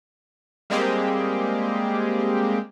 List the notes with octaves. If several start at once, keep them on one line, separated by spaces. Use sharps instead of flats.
G3 G#3 A#3 C4 G4 G#4